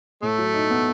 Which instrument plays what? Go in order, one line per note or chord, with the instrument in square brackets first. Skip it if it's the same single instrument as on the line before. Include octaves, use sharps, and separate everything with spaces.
[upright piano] A2 [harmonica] A3
[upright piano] F#3
D#4
B3